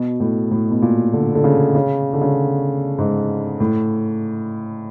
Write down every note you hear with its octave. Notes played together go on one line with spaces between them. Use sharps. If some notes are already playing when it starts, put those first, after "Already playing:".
Already playing: B2
A2
A2
B2
A#2
D3
D3
C#3
C#3
D3
C#3
G#2
A2